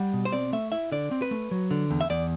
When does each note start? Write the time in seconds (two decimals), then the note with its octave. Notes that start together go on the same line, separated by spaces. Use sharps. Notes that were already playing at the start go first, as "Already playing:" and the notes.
Already playing: G3 F#5
0.13 B2
0.25 C5
0.33 C4 D5
0.53 A3 E5
0.72 E4 E5
0.92 D3 D5
1.11 C4
1.22 B4
1.31 A3
1.51 F#3
1.71 D3
1.90 E2
2.01 E5
2.10 E2 D5